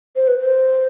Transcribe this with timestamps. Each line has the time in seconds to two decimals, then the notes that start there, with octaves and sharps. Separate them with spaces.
0.16 C5
0.28 B4
0.39 C5